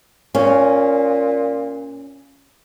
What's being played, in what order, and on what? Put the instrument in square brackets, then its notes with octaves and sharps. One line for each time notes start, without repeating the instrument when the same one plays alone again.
[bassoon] A#2 [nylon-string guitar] C#4